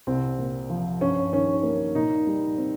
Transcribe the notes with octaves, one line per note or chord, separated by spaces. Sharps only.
C2 C4
A#2
F3
G2 C#4
D#3 C#4
A#3
A#2 D#4
G3
C4